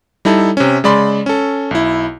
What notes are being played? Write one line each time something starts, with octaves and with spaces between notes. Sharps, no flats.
G3 D#4 E4 A4
C3 C#4
C#3 G#3 D5 B5 C6
C#4 A4
B1 E4